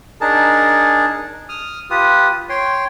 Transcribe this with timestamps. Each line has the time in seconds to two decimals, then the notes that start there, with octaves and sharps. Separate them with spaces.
0.21 D4 D#4 G#4 A#4 A5
1.49 D#6 F6
1.90 F4 G4 B4 D#6
2.49 C#5 G5 C6